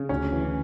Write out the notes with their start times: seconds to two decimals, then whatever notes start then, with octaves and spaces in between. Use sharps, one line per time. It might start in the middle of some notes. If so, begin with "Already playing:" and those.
Already playing: C#3
0.09 D2 C#4
0.32 E3